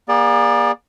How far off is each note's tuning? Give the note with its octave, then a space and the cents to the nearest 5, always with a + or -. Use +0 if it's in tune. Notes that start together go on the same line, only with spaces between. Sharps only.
A#3 +35 G#4 -35 D5 +0